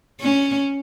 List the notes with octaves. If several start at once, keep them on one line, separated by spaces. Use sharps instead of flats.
C#4